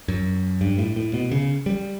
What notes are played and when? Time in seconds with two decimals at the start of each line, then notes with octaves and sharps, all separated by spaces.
0.08 F#2
0.61 G2
0.79 A2
0.96 A2
1.14 B2
1.31 C#3
1.66 G3